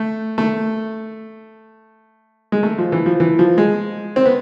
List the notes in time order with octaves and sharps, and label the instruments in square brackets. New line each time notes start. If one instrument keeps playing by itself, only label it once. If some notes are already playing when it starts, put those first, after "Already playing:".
Already playing: [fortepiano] A3
A3
G#3
A3
F3
E3
F3
E3
F3
G#3
C4
B3